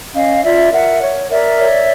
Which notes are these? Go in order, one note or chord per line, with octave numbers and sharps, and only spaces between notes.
C#4 D#5 F5
F4 D5 E5
A#4 E5 F#5
C#5
A#4 D5 E5
C#5